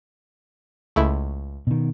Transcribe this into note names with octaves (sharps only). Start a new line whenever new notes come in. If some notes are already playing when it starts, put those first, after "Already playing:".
C#2 A3 E4
B2 D#3